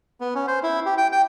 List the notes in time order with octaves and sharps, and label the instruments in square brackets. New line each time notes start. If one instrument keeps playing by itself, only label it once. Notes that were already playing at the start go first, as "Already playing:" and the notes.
[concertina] B3
C#4
C5
E4
G4
G5
G5